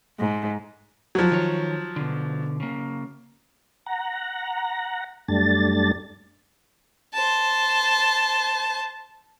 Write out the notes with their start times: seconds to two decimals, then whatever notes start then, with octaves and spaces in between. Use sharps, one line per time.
0.19 G#2
1.15 F3 F#3
1.32 D#3 C#5
1.96 B2 D3
2.60 C#3 A#3
3.86 F#5 A#5
5.28 F#2 G3 A3 D4 A6
7.13 C5 A5